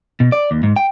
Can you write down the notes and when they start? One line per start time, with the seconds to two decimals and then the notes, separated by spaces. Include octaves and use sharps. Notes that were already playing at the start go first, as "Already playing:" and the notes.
0.20 B2
0.32 D5
0.51 D#2
0.63 G#2
0.76 G5